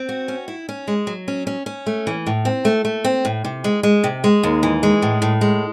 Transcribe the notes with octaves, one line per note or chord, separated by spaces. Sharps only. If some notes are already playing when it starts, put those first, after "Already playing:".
Already playing: C4
F#4
C#4
E4
C#4
G#3
F#3
C#4
C#4
C#4
A3
E3
A2
C4
A3
A3
C4
A2
C3
G#3
G#3
C3
G#3
D#2
E3
G#3
A2
A2
G#3